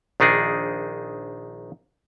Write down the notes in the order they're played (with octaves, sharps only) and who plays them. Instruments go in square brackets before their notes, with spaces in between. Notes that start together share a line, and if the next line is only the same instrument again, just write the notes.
[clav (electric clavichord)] A#1 D#3 D4 D#4 G#4